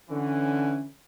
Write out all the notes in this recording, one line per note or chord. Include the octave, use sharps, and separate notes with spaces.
D3 E3 C#4